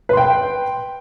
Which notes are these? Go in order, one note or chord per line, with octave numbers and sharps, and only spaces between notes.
B4 G5 C6